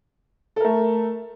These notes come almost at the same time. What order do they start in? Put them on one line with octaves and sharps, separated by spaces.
A4 A#4 A3